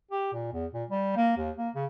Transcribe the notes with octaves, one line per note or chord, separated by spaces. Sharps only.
G4
A#2
E2
A#2
G3
A#3
D#2
A#3
C#3